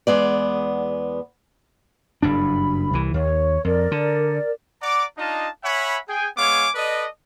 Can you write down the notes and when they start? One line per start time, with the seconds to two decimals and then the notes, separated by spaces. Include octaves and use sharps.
0.07 E2 G#3 B3 D5
2.23 F#1 G2 D4 B5
2.93 C2 E3
3.14 D#2 C#5
3.64 F2 A#4 D5
3.91 D3
4.82 D5 F#5 A#5 D6
5.17 D4 D#4 F4 D#5 F5 A5
5.64 C#5 E5 F#5 G#5 B5
6.08 G#4 G5 G#5
6.37 G#3 B3 C#5 F5 G#5 D6
6.75 A4 B4 D5 D#5